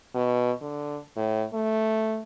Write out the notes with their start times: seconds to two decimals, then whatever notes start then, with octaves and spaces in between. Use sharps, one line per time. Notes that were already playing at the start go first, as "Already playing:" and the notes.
0.14 B2
0.61 D3
1.17 A2
1.54 A3